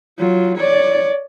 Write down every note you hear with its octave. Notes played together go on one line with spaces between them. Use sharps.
F#3 F4
C#5 D5